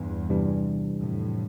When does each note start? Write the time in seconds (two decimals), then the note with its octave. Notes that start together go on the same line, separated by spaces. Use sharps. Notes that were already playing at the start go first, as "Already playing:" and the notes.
Already playing: E2 G2 E3 G3 D4
0.29 C3 E3 G3 D4
1.00 F2 A2